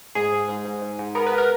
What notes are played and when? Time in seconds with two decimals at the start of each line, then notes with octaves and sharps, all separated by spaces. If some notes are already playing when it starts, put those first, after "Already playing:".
0.15 G#2 G#4
0.33 G#2
0.48 G#2
0.65 G#2
0.82 G#2
0.99 G#2
1.15 B3 A#4
1.27 B4
1.32 B3
1.38 A#4